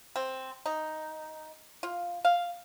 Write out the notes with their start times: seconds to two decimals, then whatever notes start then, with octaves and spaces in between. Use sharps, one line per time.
0.16 C4
0.66 D#4
1.83 F4
2.25 F5